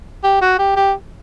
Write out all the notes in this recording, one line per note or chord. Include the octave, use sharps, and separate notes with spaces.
G4
F#4
G4
G4